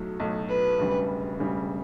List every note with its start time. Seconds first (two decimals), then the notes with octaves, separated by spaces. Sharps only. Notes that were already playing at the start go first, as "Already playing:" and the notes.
Already playing: B1 A2 F#3 A3
0.20 B1 A2 F#3 A3
0.48 B4
0.79 E1 D2 C#3 G3
1.39 E1 D2 C#3 G3